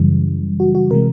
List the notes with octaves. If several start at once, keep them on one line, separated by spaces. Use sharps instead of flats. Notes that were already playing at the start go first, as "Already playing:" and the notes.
Already playing: F#2 C#3 E3 G3
F#4
F#4
C3 E3 G#3 A#4